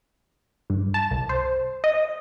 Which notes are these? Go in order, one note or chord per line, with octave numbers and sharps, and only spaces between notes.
G2
A5
C2
C5
D#5